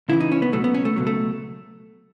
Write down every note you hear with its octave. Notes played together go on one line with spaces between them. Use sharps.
C#2 C#3 E3 E4
D#4
C#4
B3
C#2 B2 F#3 A3
B3
C#4
A3
C#2 B2 F#3
A3